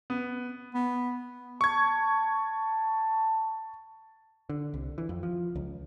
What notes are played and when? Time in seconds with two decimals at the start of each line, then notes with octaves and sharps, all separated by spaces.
0.10 B3
0.74 B3
1.61 A5 C#6 G#6
4.49 D3
4.74 C2
4.98 E3
5.09 F2
5.23 F3
5.55 C#2